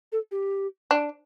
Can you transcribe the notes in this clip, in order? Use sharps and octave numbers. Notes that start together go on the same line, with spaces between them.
A4
G4
D4